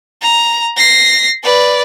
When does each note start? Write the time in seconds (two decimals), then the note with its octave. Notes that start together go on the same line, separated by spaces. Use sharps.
0.22 A#5
0.77 A#6 C7
1.44 B4 D5